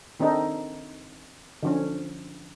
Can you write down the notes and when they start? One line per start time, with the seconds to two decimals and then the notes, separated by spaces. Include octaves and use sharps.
0.20 D#3 C4 D4 D#4 A4
1.63 D3 F3 C#4